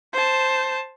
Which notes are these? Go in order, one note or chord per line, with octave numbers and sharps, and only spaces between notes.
C5 A5